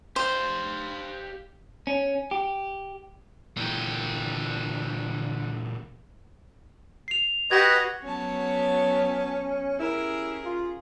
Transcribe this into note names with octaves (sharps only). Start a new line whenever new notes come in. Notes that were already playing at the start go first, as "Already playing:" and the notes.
G4 C5 F5
C#4
G4
A#2 D3 E3 G4
C7 F7
F#4 G4 B4 D#5 G#6 A#6
F#3 B3 C#4 C#5 A5
C#4 E4 G4 G#4 A#4
F4